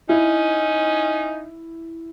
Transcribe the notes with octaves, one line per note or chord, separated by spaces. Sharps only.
C#4 D#4 E4